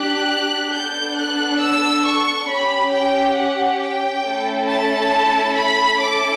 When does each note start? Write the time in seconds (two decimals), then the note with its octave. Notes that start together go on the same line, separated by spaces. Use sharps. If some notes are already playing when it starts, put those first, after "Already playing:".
Already playing: D4 G4 F#6
0.74 B3 D4 A4 G6
1.18 F#6
1.61 E6
2.06 C#6
2.50 C#4 G4 B5
2.93 G5
3.37 F#5
3.82 G5
4.25 A3 C#4 E4 A4
4.68 A5
5.57 B5
6.01 C#4 E4 A4 D6